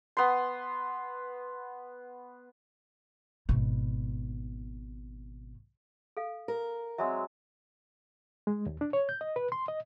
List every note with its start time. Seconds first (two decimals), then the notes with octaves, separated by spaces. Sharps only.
0.17 B3 C6
3.49 G#1 B2
6.17 A4 F5
6.48 A#4
6.98 F#3 G#3 C4 E5
8.47 G#3
8.66 D#2
8.81 D4
8.93 C#5
9.09 G6
9.21 D#5
9.36 B4
9.52 C6
9.68 D#5